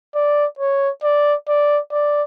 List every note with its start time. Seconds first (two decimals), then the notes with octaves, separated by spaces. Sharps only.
0.15 D5
0.59 C#5
1.04 D5
1.48 D5
1.92 D5